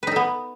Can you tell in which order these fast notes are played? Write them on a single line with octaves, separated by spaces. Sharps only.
B4 D#4 A4 B3